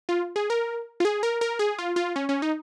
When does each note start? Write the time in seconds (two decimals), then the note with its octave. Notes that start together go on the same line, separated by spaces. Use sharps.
0.09 F4
0.36 G#4
0.50 A#4
1.00 F4
1.05 G#4
1.23 A#4
1.41 A#4
1.59 G#4
1.79 F4
1.96 F4
2.16 C#4
2.29 C#4
2.42 D#4